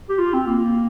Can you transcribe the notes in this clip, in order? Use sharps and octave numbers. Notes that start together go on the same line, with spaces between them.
G4
F4
C4
A#3